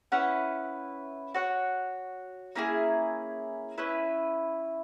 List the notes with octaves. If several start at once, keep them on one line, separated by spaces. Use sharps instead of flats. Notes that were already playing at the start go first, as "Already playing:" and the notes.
C#4 E4 B4 F#5
F#4 C#5 F#5
A#3 C#4 E4 G#4
C#4 E4 B4